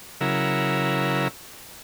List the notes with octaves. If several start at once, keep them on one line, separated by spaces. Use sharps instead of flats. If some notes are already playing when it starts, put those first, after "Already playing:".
C#3 F#3 E4 A#4